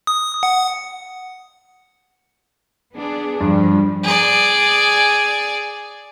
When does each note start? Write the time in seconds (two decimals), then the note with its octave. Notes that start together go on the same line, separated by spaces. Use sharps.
0.07 D#6
0.43 F#5
2.95 B3 D4 G#4
3.41 G2 F3 G3
4.04 G#4 D5